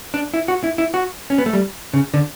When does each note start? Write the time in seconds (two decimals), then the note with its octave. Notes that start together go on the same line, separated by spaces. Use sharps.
0.14 D4
0.34 E4
0.48 F#4
0.64 E4
0.78 E4
0.94 F#4
1.30 C#4
1.38 B3
1.46 A3
1.53 G3
1.94 C#3
2.14 D3